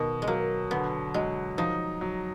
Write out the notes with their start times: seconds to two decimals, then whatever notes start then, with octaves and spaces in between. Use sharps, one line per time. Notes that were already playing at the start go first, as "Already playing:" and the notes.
Already playing: B2 D#3
0.22 G#3
0.28 F#3 A#3
0.71 D3 B3
1.14 F#3 G#3
1.58 F3 D#4
2.01 F#3